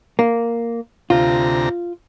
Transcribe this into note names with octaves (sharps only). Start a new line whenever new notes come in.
A#3
D2 C3 F4 A#5